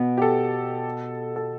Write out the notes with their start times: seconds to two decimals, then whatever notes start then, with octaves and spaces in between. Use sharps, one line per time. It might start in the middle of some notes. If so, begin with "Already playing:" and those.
Already playing: B2 B3
0.18 G4
0.22 A4
1.36 A4